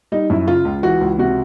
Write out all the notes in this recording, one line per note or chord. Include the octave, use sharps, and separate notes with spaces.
G3 D#4
F#2 E4
C#3 F4
C#2
E3 F#4
C#2
C3 F#4